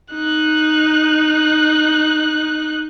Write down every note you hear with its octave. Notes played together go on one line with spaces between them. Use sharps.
D#4 F#6